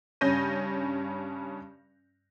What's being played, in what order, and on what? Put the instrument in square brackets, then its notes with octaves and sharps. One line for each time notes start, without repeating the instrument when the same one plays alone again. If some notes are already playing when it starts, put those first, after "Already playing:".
[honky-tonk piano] G2 C#3 C#4 G6 A#6 D#7